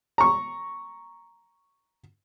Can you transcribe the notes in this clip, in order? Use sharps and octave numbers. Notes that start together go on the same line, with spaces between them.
A#5 C#6